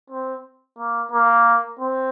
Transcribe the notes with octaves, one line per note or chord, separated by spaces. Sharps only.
C4
A#3
A#3
C4